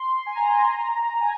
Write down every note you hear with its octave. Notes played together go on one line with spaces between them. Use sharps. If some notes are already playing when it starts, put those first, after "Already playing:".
Already playing: C6
G#5
A#5
G#5